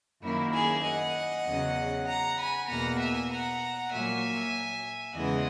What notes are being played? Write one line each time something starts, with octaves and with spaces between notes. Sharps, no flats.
F#2 D#3 F#3 A#3 E4
E4 G#4
D#5 F#5
E2 C#3 F#3
F#5 A#5
G#5 B5
E2 B2 A#3 F#5 A#5
E5 G#5
F#5 A#5
A#2 F#3 A#3 E5 G#5
E2 C#3 E3 G#3 D#5 F#5